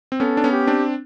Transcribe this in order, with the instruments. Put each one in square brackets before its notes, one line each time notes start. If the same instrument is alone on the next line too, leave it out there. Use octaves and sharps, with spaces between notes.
[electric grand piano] C4
[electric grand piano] B3 C#4 [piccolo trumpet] A4
[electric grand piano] D4
B3 C#4
[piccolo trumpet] G4
[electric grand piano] C4 D4